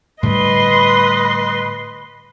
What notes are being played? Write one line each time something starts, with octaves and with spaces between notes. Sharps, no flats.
A2 D3 G3 B4 D#5 C6